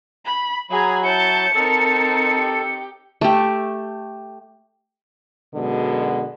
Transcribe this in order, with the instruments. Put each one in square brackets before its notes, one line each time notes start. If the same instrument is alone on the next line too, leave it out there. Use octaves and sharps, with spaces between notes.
[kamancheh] B5
[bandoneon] F#3 [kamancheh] G#4 G#5 [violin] A#5 B5
[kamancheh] E4 A5 [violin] C#5 G6 [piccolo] C#7
[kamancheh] C4 D#4 [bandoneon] A4 [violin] A#4 A5
[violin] G4
[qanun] A3 G4
[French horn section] F#2 B2 D3 G#3